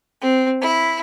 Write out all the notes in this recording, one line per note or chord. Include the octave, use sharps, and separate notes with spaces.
C4
E4